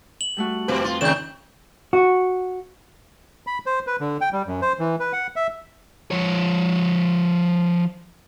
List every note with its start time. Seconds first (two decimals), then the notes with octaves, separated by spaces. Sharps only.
0.21 F#7
0.37 G3 A3 F#4
0.68 F2 B2 B4
0.84 F4
1.01 C3 D#3 G6 E7
1.93 F#4
3.47 B5
3.66 C5
3.87 B4
4.00 D3
4.21 G5
4.33 G3
4.47 F#2
4.62 C5
4.79 E3
5.00 B4
5.13 F#5
5.36 E5
6.11 F3 C#5